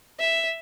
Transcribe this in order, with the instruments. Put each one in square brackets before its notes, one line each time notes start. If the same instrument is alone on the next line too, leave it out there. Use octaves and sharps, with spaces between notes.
[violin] E5